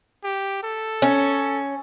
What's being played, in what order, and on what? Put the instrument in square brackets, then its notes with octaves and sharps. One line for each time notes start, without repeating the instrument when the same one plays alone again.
[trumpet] G4
A4
[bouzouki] C#4